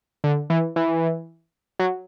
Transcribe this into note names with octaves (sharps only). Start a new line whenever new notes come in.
D3
E3
E3
F#3